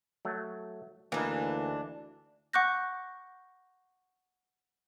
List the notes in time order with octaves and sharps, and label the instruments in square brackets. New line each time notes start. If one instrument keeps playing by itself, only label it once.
[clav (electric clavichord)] F#3 A3
[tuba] D2 [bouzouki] E3 D4 [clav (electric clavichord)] A#3 D#4
[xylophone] F#5 C#6 D6 F#6 G6 A#6